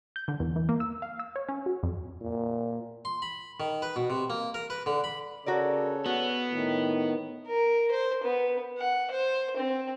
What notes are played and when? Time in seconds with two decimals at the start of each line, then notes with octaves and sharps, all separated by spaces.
0.16 G6
0.28 D3
0.40 E2
0.56 E3
0.69 A#3
0.80 E6
1.02 F5
1.19 E6
1.36 C#5
1.49 C#4
1.66 F#4
1.83 F2
2.21 A#2
3.05 C6
3.22 B5
3.60 D#3
3.82 B4
3.96 B2
4.10 C3
4.30 A#3
4.54 A#4
4.70 B4
4.86 D3
5.04 B5
5.46 C#3 F#4 A4 A#4 C#5 D5
6.06 B3 F#4
6.51 A2 D#3
7.47 A#4
7.91 C5
8.23 B3
8.78 F#5
9.11 C5
9.56 C4